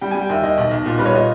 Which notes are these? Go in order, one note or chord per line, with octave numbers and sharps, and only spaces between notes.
G3 G5
G#5
G3
G5
D#2 E5
D#2 D#5
B1
B1
A#2
G3 B4
C#5
A#2 D#5